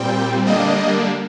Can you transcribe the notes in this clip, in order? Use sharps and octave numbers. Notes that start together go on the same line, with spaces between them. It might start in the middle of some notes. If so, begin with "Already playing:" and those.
Already playing: A#2 G3 C4 G5
D3 G3 A#3 D4 D#5